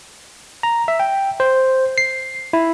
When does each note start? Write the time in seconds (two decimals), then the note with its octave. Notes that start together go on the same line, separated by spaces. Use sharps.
0.63 A#5
0.88 E5
1.00 G5
1.40 C5
1.98 C7
2.53 E4